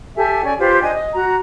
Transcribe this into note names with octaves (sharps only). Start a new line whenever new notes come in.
G4 A4 E5 G#5
C#4 D5 G#5
F4 G4 B4 C5
D4 D#5 G#5
D#5
F#4 A#5